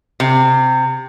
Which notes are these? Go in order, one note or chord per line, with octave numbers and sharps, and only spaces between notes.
C3